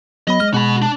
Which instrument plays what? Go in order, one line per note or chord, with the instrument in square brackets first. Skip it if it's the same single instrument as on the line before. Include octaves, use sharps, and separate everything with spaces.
[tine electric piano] F#3 B3 B5 [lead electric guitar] D#5
[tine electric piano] G#3 F6
[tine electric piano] B2 G#3 [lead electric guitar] F#4 B5
[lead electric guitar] D4